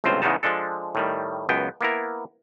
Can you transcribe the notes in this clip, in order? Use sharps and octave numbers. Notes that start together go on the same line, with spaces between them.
G1 C#2 A2 C4 F4 C5
E2 C#3 G#3 B3 D#4 A5
F3 G#3 D4 A4
A2 D#3 G3
C#2 F#2 B3 G5
A#3 B3 E4 A#4